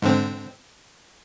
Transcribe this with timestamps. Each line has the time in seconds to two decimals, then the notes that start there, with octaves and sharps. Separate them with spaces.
0.02 G#2 D3 C4